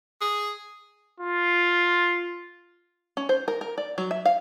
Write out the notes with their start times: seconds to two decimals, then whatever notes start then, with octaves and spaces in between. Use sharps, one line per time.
0.21 G#4
1.20 F4
3.17 C#4
3.29 C5
3.48 A#4
3.61 A#4
3.78 D5
3.98 F#3
4.11 E5
4.25 F5